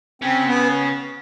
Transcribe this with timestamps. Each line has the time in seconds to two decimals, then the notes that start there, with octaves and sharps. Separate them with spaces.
0.22 C#3 C4
0.46 B3